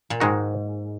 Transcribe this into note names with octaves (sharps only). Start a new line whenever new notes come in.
A#2
G#2 D#3 G#3 D#4 F#4